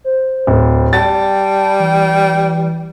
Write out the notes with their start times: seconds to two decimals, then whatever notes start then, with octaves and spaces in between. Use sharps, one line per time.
0.04 C5
0.47 D1
0.93 G3 A5 A6
1.80 E3